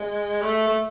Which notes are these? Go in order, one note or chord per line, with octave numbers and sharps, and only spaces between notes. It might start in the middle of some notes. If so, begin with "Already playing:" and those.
Already playing: G#3
A3
A3